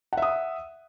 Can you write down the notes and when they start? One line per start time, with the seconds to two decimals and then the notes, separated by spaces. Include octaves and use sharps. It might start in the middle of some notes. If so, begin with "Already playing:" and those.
0.13 F#5
0.17 E5
0.22 D#6